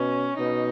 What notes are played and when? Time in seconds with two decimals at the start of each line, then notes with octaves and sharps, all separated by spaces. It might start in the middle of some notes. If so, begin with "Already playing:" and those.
Already playing: B2 C#4
0.39 B2 D#4